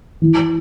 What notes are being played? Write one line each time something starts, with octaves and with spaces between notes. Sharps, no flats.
E3